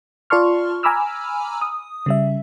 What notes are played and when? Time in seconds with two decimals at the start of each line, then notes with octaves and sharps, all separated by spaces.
0.30 F4 D5 A5 C6 C#6 F6
0.83 G#5 A#5 B5 D6 E6 F6
1.61 D#6
2.06 C#3 G3 E5